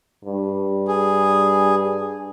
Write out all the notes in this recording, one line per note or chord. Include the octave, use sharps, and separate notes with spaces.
G2
G#4